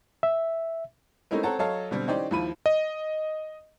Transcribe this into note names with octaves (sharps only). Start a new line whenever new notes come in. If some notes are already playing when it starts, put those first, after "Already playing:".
E5
A3 C4 C#4 D#4 E4 A#4
C4 A4 C#5 F#5 A5 A#5
F#3 A4 C#5 D#5 F5 A5
B2 D3 G3 C4
E3 C#4 D#4 G4 C5 D5
D#2 F3 E4 B5 D#7
D#5